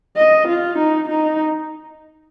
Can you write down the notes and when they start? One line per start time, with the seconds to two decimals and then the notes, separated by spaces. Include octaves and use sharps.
0.17 D#5
0.48 F4
0.78 D#4
1.09 D#4